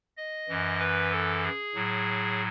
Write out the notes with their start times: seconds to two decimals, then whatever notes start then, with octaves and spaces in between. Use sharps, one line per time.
0.17 D#5
0.48 F#2 E3
0.80 B4
1.12 A4
1.43 G#4
1.75 A2 F#3